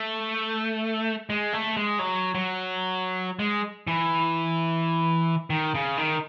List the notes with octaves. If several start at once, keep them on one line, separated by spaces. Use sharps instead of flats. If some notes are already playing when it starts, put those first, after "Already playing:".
Already playing: A3
G#3
A3
G#3
F#3
F#3
G#3
E3
D#3
C#3
D#3